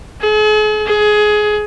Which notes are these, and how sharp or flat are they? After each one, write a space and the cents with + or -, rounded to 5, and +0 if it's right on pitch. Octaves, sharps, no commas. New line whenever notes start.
G#4 +45
G#4 +20